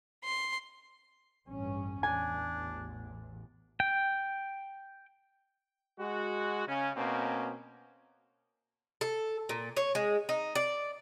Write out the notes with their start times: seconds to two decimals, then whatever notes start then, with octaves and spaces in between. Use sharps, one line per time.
0.24 C6
1.47 A1 G2 C#4
2.03 A1 E2 D4 G#5
3.80 G5
5.98 G#3 F#4
6.67 C#3 C#4
6.96 B2 A#3 C4 C#4
9.01 A4
9.49 A#2
9.77 C#5
9.95 G#3
10.29 D#4
10.55 D5